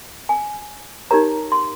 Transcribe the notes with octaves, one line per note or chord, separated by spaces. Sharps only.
G#5
D#4 G4 A#4 C#5 A#5
C6